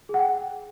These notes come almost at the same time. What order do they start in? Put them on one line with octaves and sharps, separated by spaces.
G#4 F#5 G5